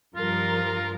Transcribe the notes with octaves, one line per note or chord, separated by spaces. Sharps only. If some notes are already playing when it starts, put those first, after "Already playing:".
G2 F3 F4 A#4